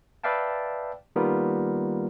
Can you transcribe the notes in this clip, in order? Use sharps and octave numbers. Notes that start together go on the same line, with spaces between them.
B4 D5 E5 F5 G5 A5
D#3 G3 A#3 B3 F4 A#4